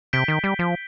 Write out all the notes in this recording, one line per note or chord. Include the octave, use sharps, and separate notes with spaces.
C3 G6 B6 D7 G7
D#3
G3
F3